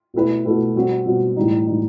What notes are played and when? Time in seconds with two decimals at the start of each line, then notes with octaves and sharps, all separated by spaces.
0.14 B2 A3 E4 B4
0.45 B2 A3 E4 B4
0.75 B2 G3 C4 F#4
1.06 B2 G3 C4 F#4
1.36 A2 E3 G3 D#4
1.67 A2 E3 G3 D#4